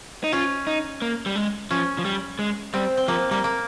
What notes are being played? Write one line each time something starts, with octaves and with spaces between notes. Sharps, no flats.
D#4
C#4 F4
D#4
A#3
G3
G#3
F3 C#4
F3
G3
G#3
G3 C4
C4
F3 A#3
G3 A#3
A#3